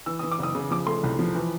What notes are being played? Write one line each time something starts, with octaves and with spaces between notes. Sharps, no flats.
E3 E6
E3 D#6
D6
F#1 D#6
C#3
F3 D6
A3 C6
C2
F3
E3